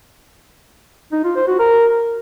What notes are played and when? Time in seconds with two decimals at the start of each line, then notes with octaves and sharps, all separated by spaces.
1.12 D#4
1.24 F4
1.36 C5
1.47 F#4
1.59 A#4